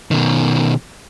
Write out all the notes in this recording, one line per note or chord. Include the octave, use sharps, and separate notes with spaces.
B2 D#3